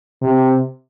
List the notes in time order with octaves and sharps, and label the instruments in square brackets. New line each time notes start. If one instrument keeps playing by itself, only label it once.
[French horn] C3